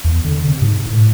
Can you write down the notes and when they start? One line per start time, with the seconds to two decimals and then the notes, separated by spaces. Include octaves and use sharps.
0.04 E2
0.24 D3
0.46 C3
0.61 G#2
0.86 A2